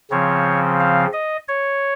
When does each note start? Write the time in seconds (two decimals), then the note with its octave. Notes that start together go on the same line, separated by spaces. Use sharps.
0.10 C#3 F3 C4 C#5
0.80 F5
1.13 D#5
1.48 C#5